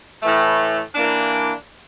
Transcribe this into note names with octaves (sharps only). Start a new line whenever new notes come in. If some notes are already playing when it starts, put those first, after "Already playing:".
A2 E3 A3
E3 A#3 D4